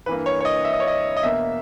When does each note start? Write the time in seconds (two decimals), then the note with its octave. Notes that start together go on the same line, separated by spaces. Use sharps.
0.06 G2 E3 A#3 B4
0.26 C#5
0.41 C#5
0.45 D#5
0.65 E5
0.73 D#5
0.80 C#5
0.88 D#5
1.17 D#5
1.23 E2 B2 A#3 E5